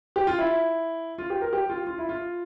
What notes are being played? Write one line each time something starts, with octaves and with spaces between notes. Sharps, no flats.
G4
F4
E4
F4
G4
A#4
G4
F4
F4
E4
F4